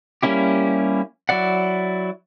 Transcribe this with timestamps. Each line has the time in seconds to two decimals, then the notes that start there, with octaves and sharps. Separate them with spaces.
0.23 G3 A#3 C#4 E4 G4
1.29 F#3 E4 D5 F#5